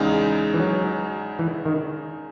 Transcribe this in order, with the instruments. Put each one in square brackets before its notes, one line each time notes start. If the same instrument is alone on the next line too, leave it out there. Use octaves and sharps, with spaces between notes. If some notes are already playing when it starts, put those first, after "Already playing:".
Already playing: [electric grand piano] E2 C#3 G#3 D#4
[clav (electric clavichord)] E3
F#3
E3
D#3